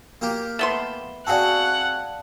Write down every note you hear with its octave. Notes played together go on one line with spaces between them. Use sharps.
A#3 F4 G4
A3 B3 C6 E7 G7
C4 F#4 G#4 D5 F5 F#5 A5